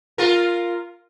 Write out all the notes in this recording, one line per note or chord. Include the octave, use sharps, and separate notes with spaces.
F4 A#4